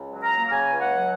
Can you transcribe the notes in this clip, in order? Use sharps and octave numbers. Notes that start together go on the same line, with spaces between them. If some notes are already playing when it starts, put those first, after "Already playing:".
Already playing: C#2
F#3
A#5
A#3
A#5
C#3 G#5
C#2
F#5
F#3